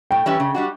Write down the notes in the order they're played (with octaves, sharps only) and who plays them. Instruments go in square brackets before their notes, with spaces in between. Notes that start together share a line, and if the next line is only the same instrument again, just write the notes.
[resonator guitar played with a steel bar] A2 [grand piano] G5
[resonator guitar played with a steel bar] E3 G3 C#4 E4
C#3
G3 D4 F#4